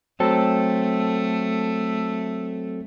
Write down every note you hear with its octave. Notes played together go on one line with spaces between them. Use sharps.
F#3 A3 C4 A4